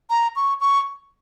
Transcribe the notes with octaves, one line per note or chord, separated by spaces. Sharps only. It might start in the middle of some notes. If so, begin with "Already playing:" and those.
A#5
C#6
C#6